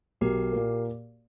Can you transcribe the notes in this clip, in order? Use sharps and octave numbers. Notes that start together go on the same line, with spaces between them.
B1 G4 A#4
A#2 A#3